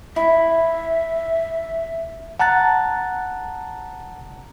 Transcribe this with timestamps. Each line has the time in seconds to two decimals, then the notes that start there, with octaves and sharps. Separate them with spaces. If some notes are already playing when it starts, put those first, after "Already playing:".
0.16 E4 E5
2.40 F#5 A5 A#5 F#6 A6